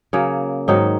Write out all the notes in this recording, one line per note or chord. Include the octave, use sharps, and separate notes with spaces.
C#3 F#3 A#3
G#2 D#3 F#3 D#4